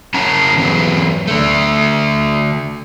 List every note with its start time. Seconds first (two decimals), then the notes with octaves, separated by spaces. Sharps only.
0.14 C#4 F#5 A5 A#5
0.57 E3 F#3 B3
1.27 D3 A3